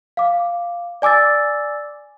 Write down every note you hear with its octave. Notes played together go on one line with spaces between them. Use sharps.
F5 D6
D5 G#5 D6 E6 A6